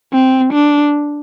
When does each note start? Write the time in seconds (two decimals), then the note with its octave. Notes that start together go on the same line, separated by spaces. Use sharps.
0.13 C4
0.53 D4